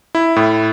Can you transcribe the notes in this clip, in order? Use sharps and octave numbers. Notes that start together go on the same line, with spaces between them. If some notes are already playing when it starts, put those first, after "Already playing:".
E4
A2